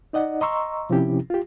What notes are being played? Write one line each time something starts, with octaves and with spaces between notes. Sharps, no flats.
D#4 D5 D#5 F#5
D#5 A#5 C6 C#6 E6
C3 F3 C4 C#4 E4 G4
F4 G4